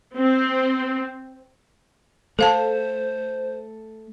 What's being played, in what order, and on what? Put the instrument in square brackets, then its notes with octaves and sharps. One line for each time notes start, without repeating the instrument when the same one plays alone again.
[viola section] C4
[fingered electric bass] A3 [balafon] A4 F5 A5 [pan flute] C5